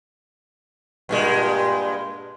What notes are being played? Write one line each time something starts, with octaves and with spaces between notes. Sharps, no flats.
G2 A#2 G#3